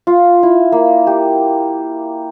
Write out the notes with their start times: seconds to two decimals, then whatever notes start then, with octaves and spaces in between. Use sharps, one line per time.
0.07 F4
0.43 E4
0.72 A#3
1.07 G4